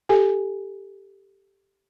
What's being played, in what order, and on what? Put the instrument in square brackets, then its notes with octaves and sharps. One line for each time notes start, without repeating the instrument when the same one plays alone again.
[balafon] G4 A4 G#5